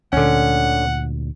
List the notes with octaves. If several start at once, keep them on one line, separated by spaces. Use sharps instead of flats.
D2 A#2 D3 C#4 F#5